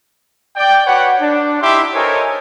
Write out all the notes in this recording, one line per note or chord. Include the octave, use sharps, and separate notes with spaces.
D5 G5
F#4 B4 C#5 D5 F#5
D4
D#4 E4 G4 E5 C6 D6
A4 A#4 C5 C#5 D#5 G#5